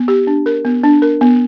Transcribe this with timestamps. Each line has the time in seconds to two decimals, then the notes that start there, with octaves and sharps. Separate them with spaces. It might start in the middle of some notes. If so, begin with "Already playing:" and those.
Already playing: B3
0.08 G4
0.27 D4
0.46 A#4
0.65 B3
0.83 D4
1.02 A#4
1.21 B3